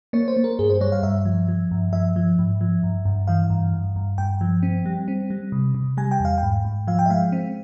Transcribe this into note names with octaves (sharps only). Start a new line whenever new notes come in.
A#3 C#5
C5
A#3
A#4
G2 G#4
C5
G3 C#5
F5
G2 E5
F3
F3
G2
F3 E5
F3
G#2
F3
G2
G2
E3 F5
G2
G2
G2
G2 G5
F3
C4
G3
C4
G3
C3
C3
G3 G#5
G5
E2
F5
G5
G#2
G#2
F3 F5
G5
E5
G#3 F5
C4